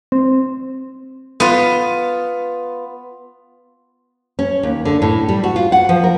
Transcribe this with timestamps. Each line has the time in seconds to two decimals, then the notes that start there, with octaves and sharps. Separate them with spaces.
0.12 C4
1.40 B3 F4
4.39 C#4
4.63 D#2
4.85 D3
5.02 A2
5.29 G3
5.44 F#4
5.56 F4
5.72 F#5
5.89 F3
6.04 A#4